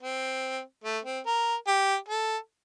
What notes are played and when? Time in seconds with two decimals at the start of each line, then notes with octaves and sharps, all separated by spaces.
0.02 C4
0.84 A3
1.05 C4
1.26 A#4
1.67 G4
2.08 A4